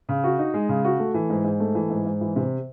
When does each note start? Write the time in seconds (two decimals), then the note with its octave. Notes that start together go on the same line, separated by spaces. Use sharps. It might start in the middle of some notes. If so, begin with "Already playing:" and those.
0.09 C#3
0.24 F#4
0.39 D#4
0.54 G#3
0.69 C#3
0.84 F#4
0.99 A3
1.14 E3
1.30 G#2
1.44 G#2
1.60 A3
1.75 E3
1.90 G#2
2.05 G#2
2.21 E3
2.36 C3